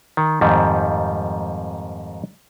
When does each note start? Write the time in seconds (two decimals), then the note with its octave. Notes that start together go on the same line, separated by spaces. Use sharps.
0.17 D#3
0.41 F2 G#2 D#3 G3